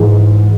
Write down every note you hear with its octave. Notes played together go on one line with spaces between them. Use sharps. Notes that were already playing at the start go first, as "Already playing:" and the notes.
Already playing: G#2 E3 G#3